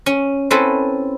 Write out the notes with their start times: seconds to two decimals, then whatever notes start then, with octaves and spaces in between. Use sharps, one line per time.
0.06 C#4
0.51 C4 C#4 E4 A4 B4